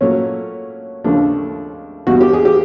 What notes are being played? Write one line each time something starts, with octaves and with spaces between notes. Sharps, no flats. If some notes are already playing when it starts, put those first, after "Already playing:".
A#2 F#3 A3 C#4
D#2 C#3 F3 A3 D4
E2 B2 G3 F#4
G4
G#4
G4